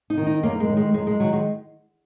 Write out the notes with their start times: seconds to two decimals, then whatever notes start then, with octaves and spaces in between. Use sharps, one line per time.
0.10 D#4
0.17 D#3
0.27 D#4
0.43 F#2 A#3
0.60 G#3
0.69 D#3
0.77 G#3
0.94 F#2 G#3
1.07 G#3
1.20 D#3 F#3
1.33 G#3